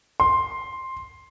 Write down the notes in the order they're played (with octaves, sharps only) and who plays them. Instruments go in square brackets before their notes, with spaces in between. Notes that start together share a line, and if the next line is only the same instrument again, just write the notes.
[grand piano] C6